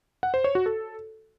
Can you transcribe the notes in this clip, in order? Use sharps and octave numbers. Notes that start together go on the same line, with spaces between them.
F#5
C5
C#5
F#4
A4